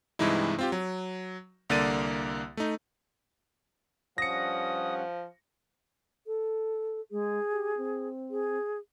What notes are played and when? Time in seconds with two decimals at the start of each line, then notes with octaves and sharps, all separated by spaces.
0.19 G2 C3 E3 G#3 D#4 E4
0.59 C4 F4 G4
0.72 F#3
1.70 C2 D3 A#3 D5 A6 D#7
2.57 A3 D#4
4.18 G2 F3 C#4 F#5 D#6 A#6 C#7
6.27 A4
7.11 G#3 G#4
7.52 G4
7.77 C4
8.30 G#4